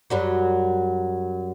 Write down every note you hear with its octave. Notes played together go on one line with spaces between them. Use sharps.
F#2 F#3 G3